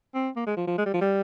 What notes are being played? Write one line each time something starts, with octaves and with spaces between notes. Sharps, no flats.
C4
A#3
G#3
F3
F3
G#3
G3
F3
G3